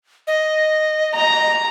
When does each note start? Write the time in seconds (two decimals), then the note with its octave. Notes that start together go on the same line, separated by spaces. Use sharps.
0.27 D#5
1.15 A#5